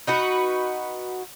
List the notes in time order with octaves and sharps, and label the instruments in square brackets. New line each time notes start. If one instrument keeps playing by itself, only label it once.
[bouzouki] D#4 F#4 B4